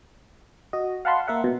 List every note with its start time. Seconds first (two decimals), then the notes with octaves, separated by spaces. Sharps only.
0.73 F#4 D#5
1.05 F5 F#5 A5 B5 C6
1.28 A#3 A#4 E5 F#5
1.44 B2